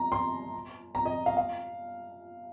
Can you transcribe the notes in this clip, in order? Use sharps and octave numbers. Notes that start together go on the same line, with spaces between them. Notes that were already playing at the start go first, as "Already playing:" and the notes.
Already playing: A#5
C6
A#5
D#5
F5
F5